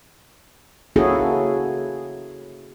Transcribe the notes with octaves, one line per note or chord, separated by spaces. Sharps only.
A#3 C#4 E4 F#4 G#4 A4